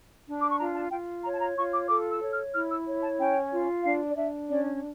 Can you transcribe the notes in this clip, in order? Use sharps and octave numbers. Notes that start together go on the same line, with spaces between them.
D4
D6
C#6
F4 A#5
A5
F4 G5
C#5 A#5
A5
A#5
F4 C#6
D6
A4 D6
E6
C#5
F6
E4 F6
E6
C#5
A5
C#4 G5
F4
D4 F5
D5
D4 E5
C#4 D5